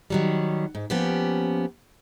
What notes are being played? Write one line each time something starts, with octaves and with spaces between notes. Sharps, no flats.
D#3 F#3 G3
G#2
F3 A#3 B3 C#4 G4